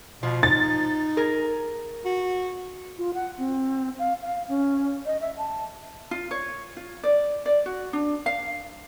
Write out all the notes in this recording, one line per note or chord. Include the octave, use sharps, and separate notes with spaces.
B2 F3
D#4 A6
G#4 A#4
F#4
F4
F#5
C4
F5
F5
C#4
D#5
E5
A5
F4
C#5
F4
D5
D5
F#4
D4
F5